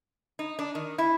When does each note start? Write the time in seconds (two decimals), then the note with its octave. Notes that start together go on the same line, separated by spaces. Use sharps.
0.39 D#4
0.59 D4
0.75 D#3
0.98 E4